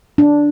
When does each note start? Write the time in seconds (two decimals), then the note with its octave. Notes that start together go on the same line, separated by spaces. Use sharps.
0.18 D4